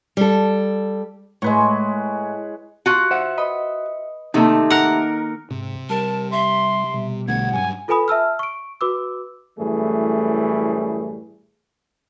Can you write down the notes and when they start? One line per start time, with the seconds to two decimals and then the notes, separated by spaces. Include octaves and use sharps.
0.17 G3 A4
1.42 A2 G#3 B4 C#5
2.86 F4 F#4
3.11 C5 E5 F#5
3.37 B4 D#5 B5
4.34 C3 D#3 A3 A#3 D#4 A4
4.70 A#4 F#5
5.50 G#2 C3
5.90 G3 A#4 A5
6.32 E5 C6
6.94 B2 G3
7.28 B1 D3 A3 F#5 G#6
7.53 G2 F#3 G#5
7.88 F4 A4 B4 G#5 B5 D#6
8.08 E5 A5 E6 F6
8.39 C#6 D7
8.81 F#4 B4 D6 E6
9.58 F#2 A2 E3 G3 A3 G#4